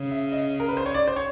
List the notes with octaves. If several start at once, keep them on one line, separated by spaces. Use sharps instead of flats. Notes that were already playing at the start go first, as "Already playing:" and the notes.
Already playing: C#3
E5
D#5
A#4
B4
C5
C#5
D5
C5
C#5